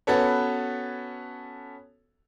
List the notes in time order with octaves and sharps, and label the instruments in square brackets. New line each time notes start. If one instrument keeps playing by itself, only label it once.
[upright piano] B3 C#4 F#4 A4 B4 C#5